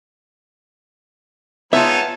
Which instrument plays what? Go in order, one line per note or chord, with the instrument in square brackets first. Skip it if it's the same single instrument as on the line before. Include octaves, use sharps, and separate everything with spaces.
[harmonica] G#3 D#4 C#5 [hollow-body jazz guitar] B3 F4 [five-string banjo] E5 [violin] A5